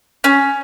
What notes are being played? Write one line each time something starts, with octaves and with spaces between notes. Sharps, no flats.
C#4